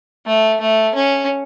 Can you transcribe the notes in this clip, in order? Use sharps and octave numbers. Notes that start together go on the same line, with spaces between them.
A3
A3
C#4